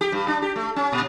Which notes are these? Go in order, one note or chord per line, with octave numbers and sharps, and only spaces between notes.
G4
G2
D4
G4
A3
C#4
A#2